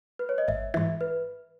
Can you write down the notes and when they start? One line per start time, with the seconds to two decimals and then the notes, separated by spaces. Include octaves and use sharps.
0.19 B4
0.29 C#5
0.38 D#5
0.48 G#1 E5
0.74 G#2 E3 E5
1.01 B4